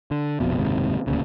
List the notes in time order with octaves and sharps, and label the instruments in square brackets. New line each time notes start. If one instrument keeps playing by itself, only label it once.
[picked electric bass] D3
F1 A#1 F2 B2
F#1 D#2 G#2 C3
D#1 D2 A#2 C#3